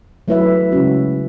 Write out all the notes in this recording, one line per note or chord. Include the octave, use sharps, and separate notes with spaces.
F#3 A3 E4 B4 E5
C#3 G#3 C#4 F#4